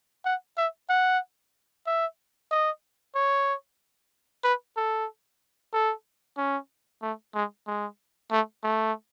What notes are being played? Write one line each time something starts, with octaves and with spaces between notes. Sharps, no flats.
F#5
E5
F#5
E5
D#5
C#5
B4
A4
A4
C#4
A3
G#3
G#3
A3
A3